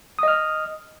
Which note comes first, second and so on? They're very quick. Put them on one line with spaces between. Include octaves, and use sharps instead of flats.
D#6 D#5 F6